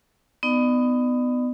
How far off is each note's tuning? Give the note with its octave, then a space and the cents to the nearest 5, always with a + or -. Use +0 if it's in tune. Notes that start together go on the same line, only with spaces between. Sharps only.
B3 +20 D#4 +0 D5 +40